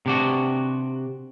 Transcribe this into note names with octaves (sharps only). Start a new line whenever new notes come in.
C3 D4 F#4